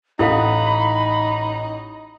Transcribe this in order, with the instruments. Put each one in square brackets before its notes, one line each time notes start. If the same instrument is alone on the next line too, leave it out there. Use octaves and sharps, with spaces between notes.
[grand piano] A1 F#5 D#6 [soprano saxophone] D#4 [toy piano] E4 A4 F5 [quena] B5